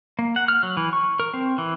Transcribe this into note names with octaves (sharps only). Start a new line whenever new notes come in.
A#3
F#5
F6
F#3
E3
C#6
A#4
C4
E3